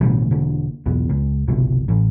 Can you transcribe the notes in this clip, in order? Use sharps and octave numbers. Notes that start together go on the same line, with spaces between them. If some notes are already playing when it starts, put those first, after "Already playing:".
A1 B2 D3 G3
E1 D3 A#3
B1 E2 B3
C#2
G1 C2 B2
A1